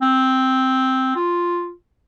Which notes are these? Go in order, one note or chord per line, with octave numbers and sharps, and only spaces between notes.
C4
F4